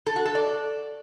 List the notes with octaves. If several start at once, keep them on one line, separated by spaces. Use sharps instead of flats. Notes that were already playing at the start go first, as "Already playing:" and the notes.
A4
F#4
A4
D5